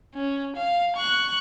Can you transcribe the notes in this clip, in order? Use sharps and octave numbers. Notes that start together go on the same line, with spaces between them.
C#4
F5
C#6 F#6